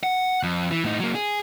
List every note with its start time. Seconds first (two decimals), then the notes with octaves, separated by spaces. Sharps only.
0.03 F#5
0.43 F2
0.71 E3
0.84 A2 D#4
1.00 F#3 A#3
1.15 G#4